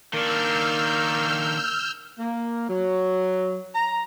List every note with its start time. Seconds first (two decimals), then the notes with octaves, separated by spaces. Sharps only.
0.13 D#3 A#3 D4 A#4 D5 E6 F6 G6
2.19 A#3
2.69 F#3
3.74 A#5